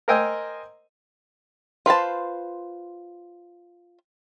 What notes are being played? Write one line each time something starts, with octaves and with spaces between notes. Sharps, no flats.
A#4 C5 D#5 G5 G#5 E6
F4 B4 C5 A5